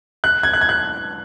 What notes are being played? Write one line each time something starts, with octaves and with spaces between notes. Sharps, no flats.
F#6
G#6
F#6
G#6
F#6